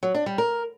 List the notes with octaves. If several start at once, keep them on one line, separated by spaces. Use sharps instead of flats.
F#3
D4
G3
A#4